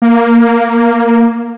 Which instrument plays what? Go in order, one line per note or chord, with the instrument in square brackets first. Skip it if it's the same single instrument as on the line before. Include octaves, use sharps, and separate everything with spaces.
[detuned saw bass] A#3